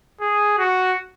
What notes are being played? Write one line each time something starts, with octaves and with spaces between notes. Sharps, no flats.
G#4
F#4